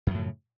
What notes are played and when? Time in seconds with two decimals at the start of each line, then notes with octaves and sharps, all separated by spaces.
0.07 F#2
0.11 F3
0.14 A2
0.18 C#3